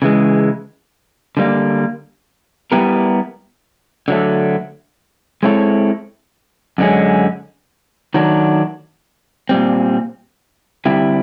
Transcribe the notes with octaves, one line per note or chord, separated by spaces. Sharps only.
C#3 E3 G#3
D3 G3 A#3
G3 B3 E4 G4 A#4
D3 F#3 A3
G#3 C4 E4 A4 C#5
F#2 D3 G#3 C#4
D#3 F#3 A3 D4
A#2 G3 C4
D3 G3 C4 E4 G4